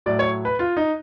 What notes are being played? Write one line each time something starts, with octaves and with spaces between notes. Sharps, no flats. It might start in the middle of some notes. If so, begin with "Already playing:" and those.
A2 F#3 D5
C#5
B4
F4
D#4